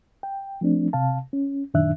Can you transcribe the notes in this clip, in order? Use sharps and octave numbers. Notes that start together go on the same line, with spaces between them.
G5
F3 A3 C4 D4
C3 F5 A5
C#4
F#2 A#2 D#3 D4 E5 F#6